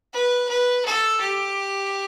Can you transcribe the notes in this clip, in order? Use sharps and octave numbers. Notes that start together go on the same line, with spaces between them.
B4
B4
A4
G4